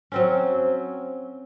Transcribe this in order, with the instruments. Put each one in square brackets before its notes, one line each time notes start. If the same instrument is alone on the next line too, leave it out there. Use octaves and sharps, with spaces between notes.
[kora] F#3 C4 C#4